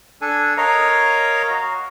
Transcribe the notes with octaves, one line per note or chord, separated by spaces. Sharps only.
D4 A4 G#5
A#4 C#5 D#5 F5 A#5
F#4